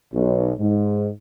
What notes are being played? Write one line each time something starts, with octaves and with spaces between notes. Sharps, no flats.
B1
G#2